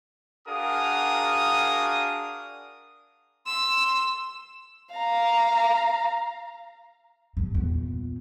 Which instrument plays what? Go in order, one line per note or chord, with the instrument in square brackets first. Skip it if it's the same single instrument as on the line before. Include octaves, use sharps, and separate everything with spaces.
[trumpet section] D4 F#4 G#4 A#4 F5 D#6
[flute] C6 [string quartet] E6
[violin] F5 A#5
[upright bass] E2 G2
E2 A#2